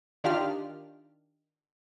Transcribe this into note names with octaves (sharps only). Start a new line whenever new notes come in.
D#3 D4 F4 G4 D#5 F6